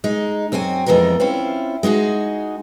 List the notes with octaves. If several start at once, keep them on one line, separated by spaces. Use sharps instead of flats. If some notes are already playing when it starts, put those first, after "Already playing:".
G#3 D#4
F#2 C4 F#4 G4 G#5
F2 E3 G#3 B3 A#4
C4 C#4 E4 F4
G#3 D#4 F#4 G#4